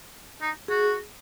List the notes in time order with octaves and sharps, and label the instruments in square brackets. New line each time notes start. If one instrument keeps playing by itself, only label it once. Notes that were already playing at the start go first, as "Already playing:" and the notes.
[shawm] D#4
[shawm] F#4 [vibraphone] G#4